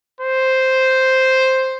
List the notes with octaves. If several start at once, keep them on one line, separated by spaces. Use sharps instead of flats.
C5